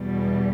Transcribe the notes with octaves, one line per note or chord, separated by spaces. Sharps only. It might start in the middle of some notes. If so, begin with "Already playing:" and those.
Already playing: E2 B2 G3